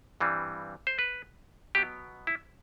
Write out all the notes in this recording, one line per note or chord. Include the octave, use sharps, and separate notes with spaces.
G2 E3 G3 C4
C5
B4
B2 F#3 B3 G4
E4